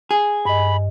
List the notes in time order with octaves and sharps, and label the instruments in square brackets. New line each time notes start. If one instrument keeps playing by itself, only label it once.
[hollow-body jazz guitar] G#4
[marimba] G2 D#5 [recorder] B5